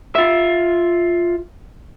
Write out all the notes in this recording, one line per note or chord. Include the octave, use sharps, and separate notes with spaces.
F4 E5